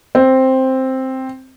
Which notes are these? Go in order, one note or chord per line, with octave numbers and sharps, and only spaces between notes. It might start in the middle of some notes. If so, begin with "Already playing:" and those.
C4